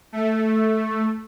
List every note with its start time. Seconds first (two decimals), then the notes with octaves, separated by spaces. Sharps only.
0.12 A3